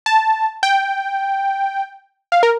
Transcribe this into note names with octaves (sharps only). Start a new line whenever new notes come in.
A5
G5
F5
A#4